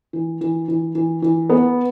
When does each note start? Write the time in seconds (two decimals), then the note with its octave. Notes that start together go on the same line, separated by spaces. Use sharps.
0.13 E3
0.41 E3
0.68 E3
0.95 E3
1.22 E3
1.50 B3